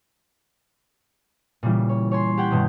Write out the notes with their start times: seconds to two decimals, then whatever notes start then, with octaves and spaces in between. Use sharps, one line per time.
1.63 A#2 C#3 E3 G3
1.89 C#5
2.11 C#5 G#5 C6
2.37 G4 F#5 G5
2.50 G2 B2 D#3